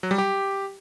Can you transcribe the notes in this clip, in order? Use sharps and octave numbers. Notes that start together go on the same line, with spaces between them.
F#3
G3
G4